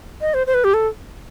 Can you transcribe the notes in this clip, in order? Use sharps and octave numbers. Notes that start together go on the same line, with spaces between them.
D#5
C5
C5
B4
G4
A4